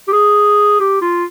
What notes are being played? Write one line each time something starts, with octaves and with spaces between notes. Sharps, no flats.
G4
G#4
G4
F4